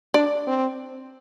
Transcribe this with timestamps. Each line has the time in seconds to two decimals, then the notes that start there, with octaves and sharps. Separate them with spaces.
0.14 D4 D5
0.47 C4